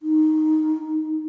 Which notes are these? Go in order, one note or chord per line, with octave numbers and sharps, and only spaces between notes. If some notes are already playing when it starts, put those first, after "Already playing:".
D#4